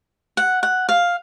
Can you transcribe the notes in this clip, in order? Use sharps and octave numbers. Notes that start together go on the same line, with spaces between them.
F#5
F#5
F5